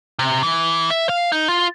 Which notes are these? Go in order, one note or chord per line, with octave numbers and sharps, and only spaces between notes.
C3
E3
E5
F5
D#4
F4